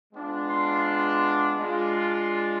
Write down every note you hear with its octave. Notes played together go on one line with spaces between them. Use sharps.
G#3 B3 D4 F4
C6
G#3 D4 F4